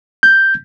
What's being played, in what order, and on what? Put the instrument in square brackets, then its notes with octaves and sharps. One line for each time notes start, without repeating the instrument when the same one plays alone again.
[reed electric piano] G6